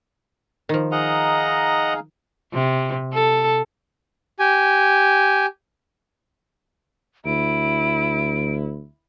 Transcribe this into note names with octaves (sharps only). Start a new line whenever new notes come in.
D#3 F3
D#4 G#4 D#5 F5 F#5 A#5
C3
A4
G4 G#5
D2 E4 D7